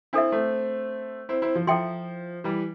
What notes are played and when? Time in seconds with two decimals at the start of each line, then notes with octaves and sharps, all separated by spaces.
0.13 C4 D4 E4 A4 E5
0.32 A3 C4
1.29 C4 E4
1.42 C4 E4
1.55 F3
1.67 F3 E4 A4 E5 G5 C6
2.44 E3 G3